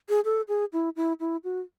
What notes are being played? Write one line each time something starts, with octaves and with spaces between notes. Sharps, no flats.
G#4
A4
G#4
E4
E4
E4
F#4